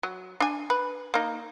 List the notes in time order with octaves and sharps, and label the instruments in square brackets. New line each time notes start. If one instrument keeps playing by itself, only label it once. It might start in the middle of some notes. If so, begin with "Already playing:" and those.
[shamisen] F#3
D4 G#5
B4
A#3 D#4